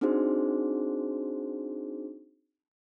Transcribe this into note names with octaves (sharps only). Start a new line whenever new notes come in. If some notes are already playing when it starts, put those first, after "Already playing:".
C4 D4 D#4 F#4 G#4 C5